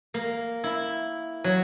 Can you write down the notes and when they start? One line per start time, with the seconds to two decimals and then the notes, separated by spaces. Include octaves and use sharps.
0.14 A#3
0.64 E4
1.44 F#3